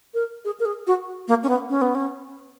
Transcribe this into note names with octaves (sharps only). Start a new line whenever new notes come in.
A#4
G#4
A#4
G#4
F#4
A#3
C#4
B3
C#4
B3
C#4